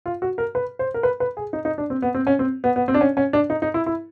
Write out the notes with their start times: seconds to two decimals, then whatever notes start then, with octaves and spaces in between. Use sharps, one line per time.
0.06 F4
0.22 F#4
0.38 A#4
0.55 B4
0.79 C5
0.94 A#4
1.03 B4
1.20 B4
1.37 G#4
1.53 D#4
1.65 D#4
1.78 D4
1.90 C4
2.02 B3
2.14 C4
2.27 C#4
2.39 C4
2.64 B3
2.76 B3
2.88 C4
2.94 D4
3.01 C#4
3.17 C#4
3.33 D4
3.50 D#4
3.62 D#4
3.74 E4
3.86 E4